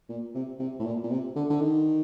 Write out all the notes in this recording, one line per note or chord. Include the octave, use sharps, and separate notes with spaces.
A#2
C3
C3
A2
A#2
A#2
C3
D3
D3
D#3